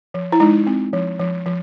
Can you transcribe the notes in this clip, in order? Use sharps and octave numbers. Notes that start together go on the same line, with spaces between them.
F3
E4
G#3 D#4
C4
F3
F3
F3